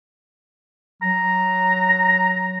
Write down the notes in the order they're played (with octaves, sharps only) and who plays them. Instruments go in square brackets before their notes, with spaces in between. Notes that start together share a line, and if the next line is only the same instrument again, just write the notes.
[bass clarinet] F#3 [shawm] A#5